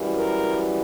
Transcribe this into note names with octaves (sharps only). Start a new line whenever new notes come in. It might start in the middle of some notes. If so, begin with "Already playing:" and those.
Already playing: F#2 E3 G3
A#4